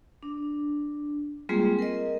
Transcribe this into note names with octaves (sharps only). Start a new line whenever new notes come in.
D4
G3 G#3 A#3 C4 F4 G#4
A#4 D#5